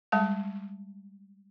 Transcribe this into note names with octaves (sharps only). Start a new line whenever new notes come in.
G3 G#3 A5